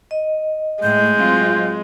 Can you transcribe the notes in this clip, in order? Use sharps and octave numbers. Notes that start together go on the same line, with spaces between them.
D#5
A2 G#3 G6
F#3 C4 F4